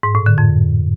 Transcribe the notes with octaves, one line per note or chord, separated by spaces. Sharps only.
G#2
A2
D3
F2